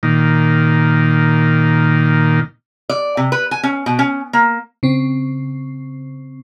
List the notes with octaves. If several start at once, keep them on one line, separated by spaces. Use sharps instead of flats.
A#2 D#3
D5
C3
B4
G#5
C#4
B2
C#4
A#3
C#3 C4